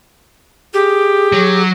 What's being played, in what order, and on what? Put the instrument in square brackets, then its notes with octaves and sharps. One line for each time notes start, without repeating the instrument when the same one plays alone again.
[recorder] G4 [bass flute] G#4
[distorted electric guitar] F#3